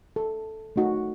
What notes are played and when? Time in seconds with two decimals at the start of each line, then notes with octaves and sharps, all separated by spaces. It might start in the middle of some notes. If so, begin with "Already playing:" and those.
0.16 A4
0.76 A3 D#4 F#4